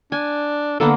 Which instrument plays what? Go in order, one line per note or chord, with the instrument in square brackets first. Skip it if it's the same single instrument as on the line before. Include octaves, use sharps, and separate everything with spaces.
[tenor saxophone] D4 [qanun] G#5
[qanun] D3 A#3 B3 [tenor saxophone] A4